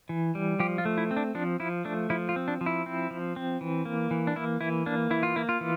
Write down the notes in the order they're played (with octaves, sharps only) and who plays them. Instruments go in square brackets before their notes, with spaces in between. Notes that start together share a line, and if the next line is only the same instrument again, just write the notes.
[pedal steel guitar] E3
G3
F3 G4
F4
A3
E4
C4
D4
F3 D4
F3 E4
A3 D4
F3 E4
F4
C4
D4
F3
E4
C4
F3
C4
E3
A#3
E3
D4
A#3 E4
E3 E4
A#3 D4
E3 E4
F4
A#3 E4
F4
E3